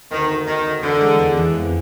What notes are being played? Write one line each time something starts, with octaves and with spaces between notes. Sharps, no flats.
D2 D#3
D2
D2 D#3
D2
D3 E3
G#3
E2
E3
F2